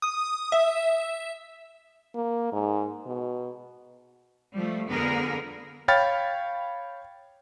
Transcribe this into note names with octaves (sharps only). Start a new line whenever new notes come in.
D#6
E5
A#3
G#2
B2
F3 G3 A3
F2 D3 B3 G#4 A#4
C#5 F5 G5 B5 F6 A6